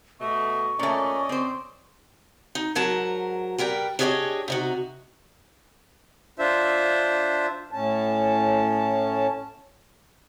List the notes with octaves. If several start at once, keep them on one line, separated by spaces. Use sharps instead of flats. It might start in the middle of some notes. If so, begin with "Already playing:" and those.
B2 A3 D#5 C#6
A#2 A3 C#4 D5 D#5
C4 C5
D#4
G#2 F#3 A#4 A5
G3 A#4 B4 G5
D4 G4 G#4 C5 C#5 D#5
C3 D#4 F#4
D4 F4 C5 E5
A2 C#4 A5